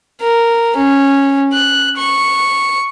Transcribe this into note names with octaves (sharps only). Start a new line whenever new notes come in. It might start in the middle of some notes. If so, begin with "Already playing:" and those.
A#4
C#4
F#6
C#6